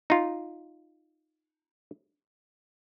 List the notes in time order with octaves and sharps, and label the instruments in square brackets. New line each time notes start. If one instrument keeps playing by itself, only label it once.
[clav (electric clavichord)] D#4 F4